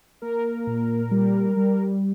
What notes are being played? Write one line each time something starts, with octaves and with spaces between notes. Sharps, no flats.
A#3 A#4
A#2
G3
G3